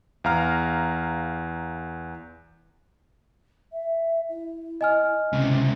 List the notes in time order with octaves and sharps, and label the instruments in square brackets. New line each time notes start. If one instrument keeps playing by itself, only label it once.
[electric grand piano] E2 F5 A#5 F6
[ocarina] E5
E4
[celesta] D#5 G#5 F6
[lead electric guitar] C#2 C3 [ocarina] C#4